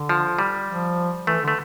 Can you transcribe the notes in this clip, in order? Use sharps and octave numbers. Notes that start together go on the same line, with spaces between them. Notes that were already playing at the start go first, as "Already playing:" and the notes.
Already playing: D3
F3
G3
F3
E3 A3
D3 A3